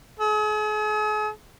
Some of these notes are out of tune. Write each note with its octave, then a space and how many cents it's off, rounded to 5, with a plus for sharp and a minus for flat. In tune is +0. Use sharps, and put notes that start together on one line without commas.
G#4 +40